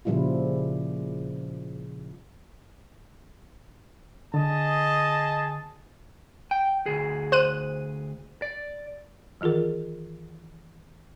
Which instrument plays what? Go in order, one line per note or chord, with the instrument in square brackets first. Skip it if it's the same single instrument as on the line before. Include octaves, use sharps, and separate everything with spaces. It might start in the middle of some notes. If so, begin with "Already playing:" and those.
[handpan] A#2 C#3 F3 G3 E4 F4
[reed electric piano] D3 [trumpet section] G#4 D#5 A5
[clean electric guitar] G5
D2 G#4
[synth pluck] C5 F#6 D#7
[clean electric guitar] D5
[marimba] D#3 E3 F4 G#4 A#4